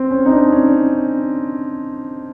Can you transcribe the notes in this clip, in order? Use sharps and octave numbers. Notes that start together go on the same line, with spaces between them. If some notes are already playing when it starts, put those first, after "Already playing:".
Already playing: C4
C#4
D#4
D4
C#4